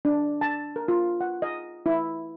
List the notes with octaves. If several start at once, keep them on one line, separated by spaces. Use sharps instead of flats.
D4
A5
A#4
F4
F#5
D#5
E4